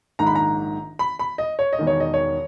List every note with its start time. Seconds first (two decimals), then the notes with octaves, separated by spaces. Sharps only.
0.19 A#1 G#2 D#3 A#5
0.27 B5
0.35 A#5
0.99 B5
1.19 B5
1.38 D#5
1.59 C#5
1.73 D#5
1.79 E1 E2 D#3
1.87 C#5
2.00 D#5
2.14 C#5